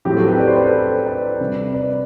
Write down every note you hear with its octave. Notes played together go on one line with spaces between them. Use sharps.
A2 F#3 C4 G4
F#4 A4
G4 B4
D5
C5
B4
A4 C5
B4 D5
C3 G3 C4
B4 D5